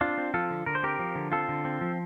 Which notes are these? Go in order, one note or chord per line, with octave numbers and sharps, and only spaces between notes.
C4 D4 F4
C4
F3 F4 A4
D3
D3 A#4
C5
C4 G4 A#4
F3
D3
C4 F4 A4
D3
C4
F3